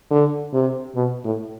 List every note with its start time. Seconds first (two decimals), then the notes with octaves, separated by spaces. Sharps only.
0.11 D3
0.53 C3
0.95 B2
1.24 A2